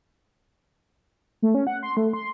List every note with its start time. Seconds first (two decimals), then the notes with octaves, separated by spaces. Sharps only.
1.42 A3
1.55 C#4
1.67 F#5
1.83 C6
1.97 A3
2.13 C6